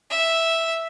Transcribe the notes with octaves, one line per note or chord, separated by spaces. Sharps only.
E5